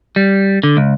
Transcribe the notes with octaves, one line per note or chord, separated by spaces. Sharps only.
G3
D3
C#2